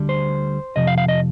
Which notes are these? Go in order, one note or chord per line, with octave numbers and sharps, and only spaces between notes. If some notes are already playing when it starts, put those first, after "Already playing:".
Already playing: D2 D3 G3
C5
F2 C3 F3 D#5
F5
F5
D#5